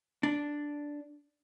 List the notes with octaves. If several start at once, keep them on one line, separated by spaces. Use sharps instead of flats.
D4